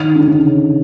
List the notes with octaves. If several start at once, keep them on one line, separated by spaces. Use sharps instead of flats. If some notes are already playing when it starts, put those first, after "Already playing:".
Already playing: D#3
D3
C#3